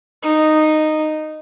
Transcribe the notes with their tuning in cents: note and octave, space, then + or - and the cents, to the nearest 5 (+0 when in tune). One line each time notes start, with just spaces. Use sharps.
D#4 -10